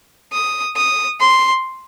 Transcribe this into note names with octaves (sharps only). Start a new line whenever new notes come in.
D#6
D#6
C6